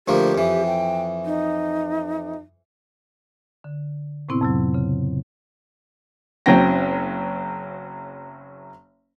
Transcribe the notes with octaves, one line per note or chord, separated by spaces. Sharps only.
D2 F3 A#3 G4
F2 E3
G5
D#4
D3
A2 C3 B3 C4 E4
F2 C3 F#3
C#3
F#1 F#3 C4 C#4 G5 A#6